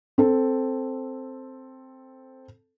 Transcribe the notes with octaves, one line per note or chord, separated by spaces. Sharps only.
C4 A4